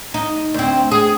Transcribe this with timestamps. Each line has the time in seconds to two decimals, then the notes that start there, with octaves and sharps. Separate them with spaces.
0.14 D#4
0.54 D2 C4
0.91 G#4